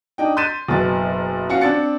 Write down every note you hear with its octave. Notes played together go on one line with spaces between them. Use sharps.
D4 D#4 G5
C6 G6 A6 B6 D#7 E7
F#1 B2 B3 A6
C#4 F4 F#4 C#7
C4 D4 A6 C#7